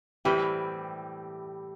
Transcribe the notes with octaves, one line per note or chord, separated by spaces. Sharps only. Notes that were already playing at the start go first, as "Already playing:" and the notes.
A2 E3 G3 C4 G4